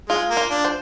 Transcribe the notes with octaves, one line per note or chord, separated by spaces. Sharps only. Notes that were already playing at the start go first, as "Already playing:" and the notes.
G#3 F4
A#3
F4
D4
C5